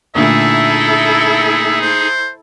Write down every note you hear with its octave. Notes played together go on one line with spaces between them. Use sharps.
A#2 D3 A3 D#4 E4 G#4 A4 E5
C5